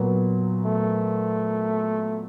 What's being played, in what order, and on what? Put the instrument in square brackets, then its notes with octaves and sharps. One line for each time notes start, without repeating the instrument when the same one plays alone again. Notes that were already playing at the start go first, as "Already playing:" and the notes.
Already playing: [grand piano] A#2 F#3 B3
[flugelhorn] A3